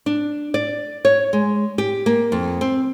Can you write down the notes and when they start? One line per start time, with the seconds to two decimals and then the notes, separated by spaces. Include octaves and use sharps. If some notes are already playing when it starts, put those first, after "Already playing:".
0.06 D4
0.54 D5
1.05 C#5
1.33 G#3
1.78 G4
2.06 A#3
2.32 F2
2.61 C4